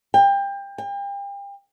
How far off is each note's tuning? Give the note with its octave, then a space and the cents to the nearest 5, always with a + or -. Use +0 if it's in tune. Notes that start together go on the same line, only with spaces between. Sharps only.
G5 +25
G5 +35